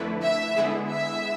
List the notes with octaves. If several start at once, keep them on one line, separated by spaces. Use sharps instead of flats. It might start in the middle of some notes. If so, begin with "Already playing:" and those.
Already playing: F2 D3 A3 E4 B4
E5
D3 G#3 B3 E4 G#4
E5